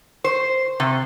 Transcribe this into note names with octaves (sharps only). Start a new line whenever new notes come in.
C5
C3